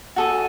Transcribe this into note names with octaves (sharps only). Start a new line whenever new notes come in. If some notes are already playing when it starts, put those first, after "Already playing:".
F#4 A4 D#5 G#5